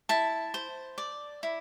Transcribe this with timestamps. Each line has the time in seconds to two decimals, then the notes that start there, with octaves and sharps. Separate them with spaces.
0.09 E4 A5
0.54 C5
0.98 D5
1.43 E4